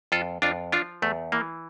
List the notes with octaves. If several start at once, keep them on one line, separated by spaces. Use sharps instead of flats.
F2 F4 A4
F2 D4 F4
F3 D4 F4
E2 A3
E3 A#3